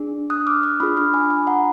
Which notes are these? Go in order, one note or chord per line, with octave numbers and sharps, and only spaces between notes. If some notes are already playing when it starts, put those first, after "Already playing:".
Already playing: D4 G#4
D#6 F#6
D6 F6
D6 F6
D4 F4 G#4 B5 D#6
D6 F6
G#5 B5
G#5 B5
F#5 A#5